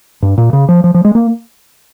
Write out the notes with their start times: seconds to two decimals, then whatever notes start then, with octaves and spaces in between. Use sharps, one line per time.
0.22 G2
0.38 A#2
0.53 C#3
0.69 F3
0.84 F3
0.94 F3
1.05 G#3
1.15 A#3